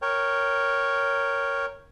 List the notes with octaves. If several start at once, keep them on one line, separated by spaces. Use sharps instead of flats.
A#4 C#5 G5